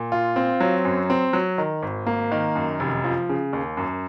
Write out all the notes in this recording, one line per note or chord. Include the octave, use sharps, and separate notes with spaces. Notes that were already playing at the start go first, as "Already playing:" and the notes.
Already playing: A#2
F4
C4
F#3
F#2
C4
F#3
D#3
G#1
A#3
D#3
F#2
F1
F3
C#3
D#2
F#2